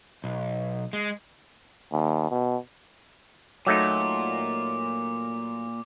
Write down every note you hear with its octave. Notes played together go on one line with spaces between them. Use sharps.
B1
G#3
D#2
B2
A#2 F#3 A3 D#4 F4 D6